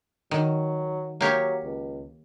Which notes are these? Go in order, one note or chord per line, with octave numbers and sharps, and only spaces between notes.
D#3 F#3
F#3 A#3 G4 C#5
C#2